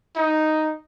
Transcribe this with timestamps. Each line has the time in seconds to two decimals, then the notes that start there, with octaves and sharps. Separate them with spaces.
0.16 D#4